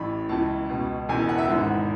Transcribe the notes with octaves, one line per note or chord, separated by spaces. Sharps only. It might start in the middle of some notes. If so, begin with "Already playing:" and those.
Already playing: A1 A2 E3 B5
C#2 C#3 E3 A5
C#2 B2
E1 E2 C#3 E3 G#5
A5
F#5
E5
G#1 G#2 E3 F#5